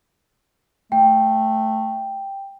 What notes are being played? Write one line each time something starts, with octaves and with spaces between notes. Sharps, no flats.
A3 G5